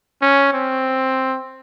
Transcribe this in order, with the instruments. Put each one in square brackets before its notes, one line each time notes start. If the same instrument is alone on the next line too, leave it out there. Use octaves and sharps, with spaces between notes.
[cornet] C#4
C4